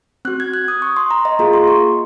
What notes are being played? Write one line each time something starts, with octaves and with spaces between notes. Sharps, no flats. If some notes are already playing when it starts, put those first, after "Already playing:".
C4 F#4 F#6
G#6
F#6
D#6
C#6
C6
A#5
D#5
A#3 F4 G#4 A#5
C6
C#6